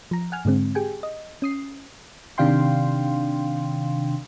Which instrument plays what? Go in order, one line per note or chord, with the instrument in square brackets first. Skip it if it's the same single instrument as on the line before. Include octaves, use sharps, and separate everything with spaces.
[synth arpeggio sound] F3 A#5
F#5 G#5 F6
G#2 D3 G#3 C4
G4 G#4 G5 G#5
D#5
C#4 D#6 C7
[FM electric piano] C3 D#3 D4 F5 G5 C6